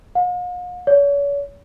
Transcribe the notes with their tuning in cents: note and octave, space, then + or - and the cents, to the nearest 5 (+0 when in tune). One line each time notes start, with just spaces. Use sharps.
F5 +45
C#5 +40